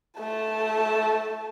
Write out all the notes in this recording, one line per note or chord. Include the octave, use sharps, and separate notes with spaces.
A3 A5